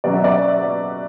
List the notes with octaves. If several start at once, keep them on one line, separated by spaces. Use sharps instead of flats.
B2 F#3 C#4 D5
E5
D5